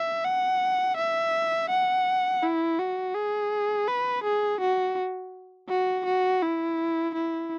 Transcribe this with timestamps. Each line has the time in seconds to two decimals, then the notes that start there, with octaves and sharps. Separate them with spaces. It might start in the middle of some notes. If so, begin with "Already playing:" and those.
Already playing: E5
0.25 F#5
0.97 E5
1.70 F#5
2.43 E4
2.79 F#4
3.15 G#4
3.88 B4
4.24 G#4
4.61 F#4
5.69 F#4
6.06 F#4
6.43 E4
7.15 E4